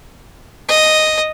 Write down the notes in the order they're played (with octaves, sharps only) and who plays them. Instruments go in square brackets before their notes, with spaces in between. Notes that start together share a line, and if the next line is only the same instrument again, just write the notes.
[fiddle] D#5